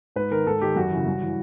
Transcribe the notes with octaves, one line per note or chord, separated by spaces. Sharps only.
G#2 B4
D#3 A#4
G#2 A4
D#3 G4
F#2 F#4
C#3 E3
G2
E3